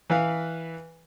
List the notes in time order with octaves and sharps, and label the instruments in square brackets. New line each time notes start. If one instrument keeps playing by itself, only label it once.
[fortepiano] E3 B4 F5